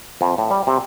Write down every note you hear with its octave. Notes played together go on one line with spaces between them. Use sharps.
F2
A2
G3
C3